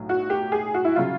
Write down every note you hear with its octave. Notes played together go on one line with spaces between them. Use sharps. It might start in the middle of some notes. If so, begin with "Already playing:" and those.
Already playing: B1 A2 F#3
F#4
G4
G#4
F#4
E4
C#3 F#3 F4